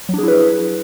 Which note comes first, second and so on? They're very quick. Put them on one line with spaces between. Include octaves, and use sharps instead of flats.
F#3 D4 G#4 E4 B4